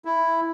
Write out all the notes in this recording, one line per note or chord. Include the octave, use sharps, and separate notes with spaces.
E4